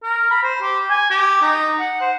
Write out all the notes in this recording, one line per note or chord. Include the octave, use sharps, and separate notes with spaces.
A#4
B5
C5
G4
G#5
G4
D#4
F#5
C5